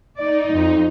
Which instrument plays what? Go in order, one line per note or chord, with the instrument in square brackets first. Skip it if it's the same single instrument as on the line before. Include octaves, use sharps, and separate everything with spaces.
[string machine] D#4 [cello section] D5
[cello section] F2